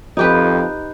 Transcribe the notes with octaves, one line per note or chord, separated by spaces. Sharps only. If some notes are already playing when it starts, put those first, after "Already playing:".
F2 D#4 G4 B4